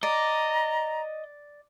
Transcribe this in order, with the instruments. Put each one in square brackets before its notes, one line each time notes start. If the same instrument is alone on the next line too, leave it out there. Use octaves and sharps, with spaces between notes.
[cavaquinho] D5 [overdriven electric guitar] D#5 [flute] A#5